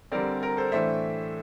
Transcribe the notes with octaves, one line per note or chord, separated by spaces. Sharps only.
D3 G3 C4 A#4 D5
A#4
A4 C5
A2 E3 A3 D4 C5 E5